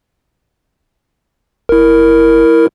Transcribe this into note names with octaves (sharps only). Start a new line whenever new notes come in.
F#1 E4 A#4